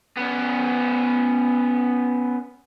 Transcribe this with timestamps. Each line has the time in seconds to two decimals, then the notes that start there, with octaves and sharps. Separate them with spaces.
0.17 B3 C#4